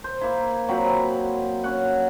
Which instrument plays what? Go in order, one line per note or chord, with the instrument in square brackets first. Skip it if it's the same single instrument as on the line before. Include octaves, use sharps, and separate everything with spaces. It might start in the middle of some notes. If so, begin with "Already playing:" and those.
[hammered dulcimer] C5
A#3 E4
A#2 F#3 C4 B5
C#4 F#5